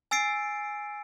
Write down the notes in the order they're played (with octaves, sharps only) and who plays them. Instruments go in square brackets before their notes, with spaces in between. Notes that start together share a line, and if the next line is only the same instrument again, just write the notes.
[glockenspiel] G#5 E6 A6 C7 D7